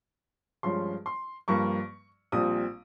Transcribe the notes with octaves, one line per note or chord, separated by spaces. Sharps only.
G2 F3 G#3 C#4 C6
C6
G2 F3 A#3 C#6
A#1 A#2 G3 C4 D#6